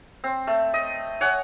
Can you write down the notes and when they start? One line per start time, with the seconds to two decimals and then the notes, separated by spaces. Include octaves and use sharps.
0.24 C4
0.47 A3
0.74 D#5
1.21 C#5 F#5 G#5